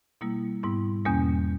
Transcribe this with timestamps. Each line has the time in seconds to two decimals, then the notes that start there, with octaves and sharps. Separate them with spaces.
0.21 B2 G3 A#3 E4
0.63 G#2 G3 B3 E4
1.06 E2 B2 G3 A#3 C#4